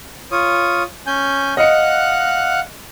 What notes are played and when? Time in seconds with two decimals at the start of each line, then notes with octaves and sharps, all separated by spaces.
0.32 F4 C#5 D#6
1.07 C#4 G#5 G6
1.57 D#5 F5 F#5 F#6 C#7